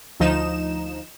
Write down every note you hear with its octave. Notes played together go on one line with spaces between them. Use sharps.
D2 F3 D#4 E7